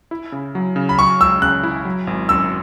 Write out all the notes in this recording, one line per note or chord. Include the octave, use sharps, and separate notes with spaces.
E4
C#3
F#3
C#3
B5
F#3 C#6
C#2 E6
C#3 F#6
E4
F#3
G#1
F#2 E6